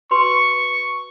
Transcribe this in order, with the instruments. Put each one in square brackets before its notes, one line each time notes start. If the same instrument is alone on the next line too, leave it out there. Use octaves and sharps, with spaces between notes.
[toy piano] F#4 B4 C6 [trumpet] C#6